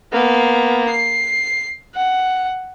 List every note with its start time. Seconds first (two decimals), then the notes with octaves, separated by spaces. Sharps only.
0.13 A#3 B3
0.90 C7
1.95 F#5